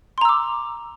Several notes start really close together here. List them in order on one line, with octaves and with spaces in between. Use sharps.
C6 A#5 E6 D6